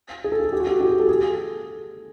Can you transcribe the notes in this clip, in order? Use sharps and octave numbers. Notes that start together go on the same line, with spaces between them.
G#4
A4
G#4
G4
F#4
G4
G4
G#4
A4
G#4